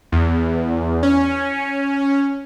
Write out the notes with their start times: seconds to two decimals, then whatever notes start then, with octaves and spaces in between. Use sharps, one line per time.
0.12 E2
1.03 C#4